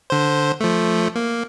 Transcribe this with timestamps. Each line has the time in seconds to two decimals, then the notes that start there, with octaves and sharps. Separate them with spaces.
0.10 D3 C5
0.60 F3 A3
1.15 A#3